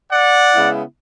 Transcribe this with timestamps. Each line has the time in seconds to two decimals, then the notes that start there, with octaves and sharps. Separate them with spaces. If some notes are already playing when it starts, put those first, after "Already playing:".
0.12 D5 F#5
0.53 C#3 G#3 B3 E4